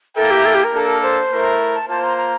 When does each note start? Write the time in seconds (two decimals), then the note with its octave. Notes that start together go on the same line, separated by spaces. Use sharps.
0.16 A#3 E4 A4 A#4 E5 G5
0.31 G4
0.45 A4
0.55 G4
0.64 A#4
0.73 A#3 D4 A4
1.03 C5
1.31 A3 E4 A#4
1.75 A5
1.89 A#3 F4 C5 A5
2.04 A#5
2.17 A#5